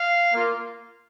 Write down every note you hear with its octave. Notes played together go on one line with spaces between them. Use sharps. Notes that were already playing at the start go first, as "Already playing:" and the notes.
Already playing: F5
A#3 F4